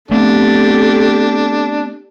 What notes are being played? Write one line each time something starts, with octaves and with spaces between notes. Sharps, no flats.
A3 B3 C4 D4 G4 A4